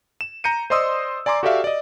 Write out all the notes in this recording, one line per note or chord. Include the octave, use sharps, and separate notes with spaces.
E7
A#5 G6 C#7 D#7
C5 D5 D#5 C6 D#6 E6
D5 G#5 A#5 C6 D6
F#4 G4 A4 D5 E5 F5
D5 D#5